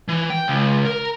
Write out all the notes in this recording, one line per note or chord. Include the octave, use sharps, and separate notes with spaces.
E3
G5
C#2
A#4